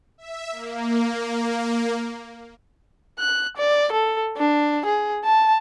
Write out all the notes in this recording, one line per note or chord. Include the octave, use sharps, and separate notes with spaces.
E5
A#3
F#6
D5
A4
D4
G#4
A5